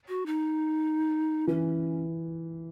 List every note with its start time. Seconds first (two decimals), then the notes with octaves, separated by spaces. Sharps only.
0.08 F#4
0.26 D#4
1.47 E3 C#4